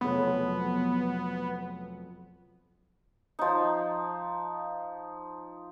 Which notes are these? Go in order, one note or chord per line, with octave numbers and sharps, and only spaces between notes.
F1 F2 F#3 B3
F3 D#4